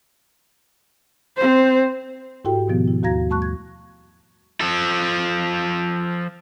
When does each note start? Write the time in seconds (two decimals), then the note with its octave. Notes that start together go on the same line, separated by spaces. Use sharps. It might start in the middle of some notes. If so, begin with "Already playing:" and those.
1.37 C4 C5
2.45 G#2 E4 F#4 G4 A4 G5
2.67 G#2 B2 D#3 F3 B3
2.88 E4
3.03 D#2 F#4 F5 A#5 G#6 A#6
3.29 G3 A3 A5 C#6 F#6
3.42 G#6
4.61 F3 A4